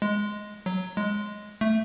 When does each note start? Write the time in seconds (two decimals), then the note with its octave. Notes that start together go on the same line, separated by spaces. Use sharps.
0.02 G#3
0.66 F#3
0.97 G#3
1.61 A3